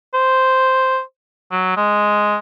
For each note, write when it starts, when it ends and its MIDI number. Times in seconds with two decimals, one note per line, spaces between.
0.14 1.00 72
1.52 1.72 54
1.77 2.37 56